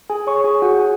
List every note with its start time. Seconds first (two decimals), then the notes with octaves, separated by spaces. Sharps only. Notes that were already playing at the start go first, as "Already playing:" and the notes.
0.10 G#4 G#5
0.27 C#5 C#6
0.44 G#4 G#5
0.62 F#4 F#5
0.79 F#4 G#4 G#5